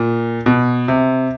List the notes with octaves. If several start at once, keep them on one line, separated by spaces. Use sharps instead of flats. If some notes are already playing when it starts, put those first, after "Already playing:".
Already playing: A#2
B2
C3